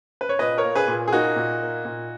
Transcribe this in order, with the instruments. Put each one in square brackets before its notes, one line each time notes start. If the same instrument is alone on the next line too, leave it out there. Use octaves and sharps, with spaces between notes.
[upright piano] B4
C#5
A#2 B4 D#5
A#4 C#5
A#3
G#4 B4
A#2
G#4
A#3 D#4 F#4
A#2
A#3
A#2